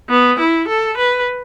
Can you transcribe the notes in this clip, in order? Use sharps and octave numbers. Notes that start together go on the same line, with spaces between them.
B3
E4
A4
B4